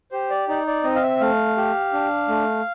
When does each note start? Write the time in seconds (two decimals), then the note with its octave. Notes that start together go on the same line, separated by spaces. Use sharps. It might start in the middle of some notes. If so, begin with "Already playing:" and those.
0.12 G4 C5
0.30 D5
0.49 D#4 D5
0.67 D5
0.84 C4 D#5
0.95 F5
1.02 E5
1.20 A3 F5
1.57 G4
1.93 D4
2.28 A3